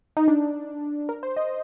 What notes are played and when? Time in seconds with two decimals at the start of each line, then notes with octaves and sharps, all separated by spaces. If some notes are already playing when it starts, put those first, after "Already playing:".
0.17 D#4
0.28 D4
1.09 A#4
1.23 C5
1.37 D#5